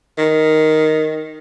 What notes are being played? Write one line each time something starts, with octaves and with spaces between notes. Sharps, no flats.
D#3